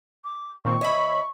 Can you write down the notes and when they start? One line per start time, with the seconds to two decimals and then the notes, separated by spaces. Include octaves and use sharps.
0.24 D6
0.65 A#2 D#3 C4 C#6
0.81 D2 C#5 D#5 E5 B5